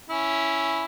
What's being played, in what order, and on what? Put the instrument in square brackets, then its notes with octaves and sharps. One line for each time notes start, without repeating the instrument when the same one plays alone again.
[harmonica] C#4 E4